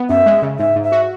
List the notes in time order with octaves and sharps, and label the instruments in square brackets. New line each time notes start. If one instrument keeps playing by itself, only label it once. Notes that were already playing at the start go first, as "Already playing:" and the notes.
Already playing: [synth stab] B3
[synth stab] F#2 [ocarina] E5
[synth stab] G#3
C#3
[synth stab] G#2 [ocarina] E5
[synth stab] G#2
[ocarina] E5
[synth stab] F#4